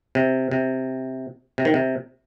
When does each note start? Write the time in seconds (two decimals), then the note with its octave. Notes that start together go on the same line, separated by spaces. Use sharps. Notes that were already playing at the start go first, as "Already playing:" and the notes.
0.15 C3
0.51 C3
1.58 C3
1.65 D#3
1.74 C3